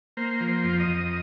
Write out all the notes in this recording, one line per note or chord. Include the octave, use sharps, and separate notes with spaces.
A#3 C5
F3
C5
F2
D#5
F2